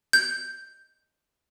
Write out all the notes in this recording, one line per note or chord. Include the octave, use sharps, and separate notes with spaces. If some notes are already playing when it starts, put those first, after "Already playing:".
G6